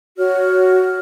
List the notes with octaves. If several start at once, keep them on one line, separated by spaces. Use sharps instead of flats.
F#4 C#5 F6